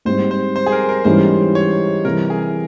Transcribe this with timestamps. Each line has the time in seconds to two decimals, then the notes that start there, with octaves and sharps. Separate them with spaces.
0.05 G#2 G3 C4 C5
0.31 C5
0.56 C5
0.66 G#4
0.72 A#4
0.89 A#4
1.05 G#2 E3 G3 C#4 E4 C5
1.55 C#5
2.04 C3 E3 G3 A#4
2.30 G#4